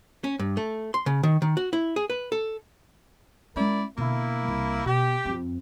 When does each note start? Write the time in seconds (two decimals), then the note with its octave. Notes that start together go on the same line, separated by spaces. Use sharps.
0.24 C#4
0.39 G2
0.57 A3
0.94 C6
1.06 C#3
1.23 D#3
1.42 D#3
1.57 F#4
1.73 E4
1.96 G#4
2.10 B4
2.32 A4
3.56 G#3 C#4 E4 A#4 D5
3.98 B2 D3 A#3 E4
4.48 C2
4.86 B2 G4
5.26 F2 C4